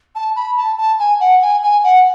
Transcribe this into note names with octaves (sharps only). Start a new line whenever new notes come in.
A5
B5
A5
A5
G#5
F#5
G#5
G#5
F#5